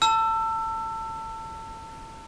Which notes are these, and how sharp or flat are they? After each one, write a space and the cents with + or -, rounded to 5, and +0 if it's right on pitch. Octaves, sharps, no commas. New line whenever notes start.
A5 +30 E6 +20